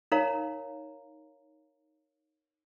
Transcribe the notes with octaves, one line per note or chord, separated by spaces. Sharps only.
D#4 A#4 C#5 F5 A#5